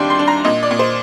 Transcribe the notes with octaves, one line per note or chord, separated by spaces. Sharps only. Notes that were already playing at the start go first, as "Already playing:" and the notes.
Already playing: D#2 G3 D4 D5 G5 C6
C6
D4
A#5
A#2 D#5
D5
A#2
C5